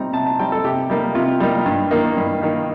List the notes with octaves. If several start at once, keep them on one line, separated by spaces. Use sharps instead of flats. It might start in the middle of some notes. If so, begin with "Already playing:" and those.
Already playing: C3 G3 C4 D#4 A#5
C3 A5
A5
G3 C4 D#4 G5
A4
C3 G4
G3 A#3 D#4
C3 F4
G3 A#3 D#4
G2
D#3 A#3 D#4
G2
D#3 A#3 D#4